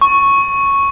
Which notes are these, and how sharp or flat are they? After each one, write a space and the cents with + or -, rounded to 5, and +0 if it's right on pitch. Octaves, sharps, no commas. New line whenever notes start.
C#6 -5